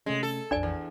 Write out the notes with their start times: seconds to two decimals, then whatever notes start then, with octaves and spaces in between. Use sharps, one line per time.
0.06 C3 G#3 A3 C#4
0.23 A4
0.51 A#1 F2 D4 D5 G#5
0.63 E2